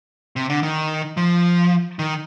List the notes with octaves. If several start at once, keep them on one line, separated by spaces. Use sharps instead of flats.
C3
D3
D#3
F3
D#3